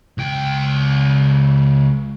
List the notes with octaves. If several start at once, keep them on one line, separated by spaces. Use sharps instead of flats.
C#2 G5